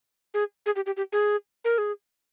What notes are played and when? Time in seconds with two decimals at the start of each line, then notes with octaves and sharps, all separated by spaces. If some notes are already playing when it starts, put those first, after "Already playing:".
0.34 G#4
0.66 G#4
0.76 G4
0.86 G4
0.97 G4
1.13 G#4
1.65 A#4
1.78 G#4